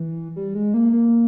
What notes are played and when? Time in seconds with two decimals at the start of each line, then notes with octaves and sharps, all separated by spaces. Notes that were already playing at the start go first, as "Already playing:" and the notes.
Already playing: E3
0.36 G3
0.55 G#3
0.74 A#3
0.93 A#3